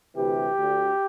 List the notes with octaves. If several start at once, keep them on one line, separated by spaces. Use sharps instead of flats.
D2 C3 E3 G4
D2 D3